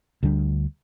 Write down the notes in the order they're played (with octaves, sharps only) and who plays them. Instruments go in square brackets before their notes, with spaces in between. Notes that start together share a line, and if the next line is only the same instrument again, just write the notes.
[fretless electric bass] D2 D3 G3 D4